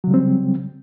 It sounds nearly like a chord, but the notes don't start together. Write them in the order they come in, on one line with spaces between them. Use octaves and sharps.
F#3 C#3 G3 C4